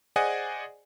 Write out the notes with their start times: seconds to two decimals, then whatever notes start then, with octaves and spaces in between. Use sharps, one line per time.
0.16 G#4 C5 D5 D#5 F#5 G#5